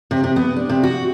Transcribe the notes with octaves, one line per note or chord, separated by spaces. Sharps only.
C3
C3
B3
D4
C3
F#4